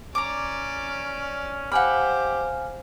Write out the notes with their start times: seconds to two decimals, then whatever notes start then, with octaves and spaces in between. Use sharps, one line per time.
0.15 C#4 D5 A#5 D6
1.72 G4 C5 F5 F#5 G#5 B5 F6